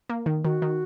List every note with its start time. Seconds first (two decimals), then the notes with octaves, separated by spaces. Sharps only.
0.09 A#3
0.26 D#3
0.45 D#3 F#4
0.62 D#3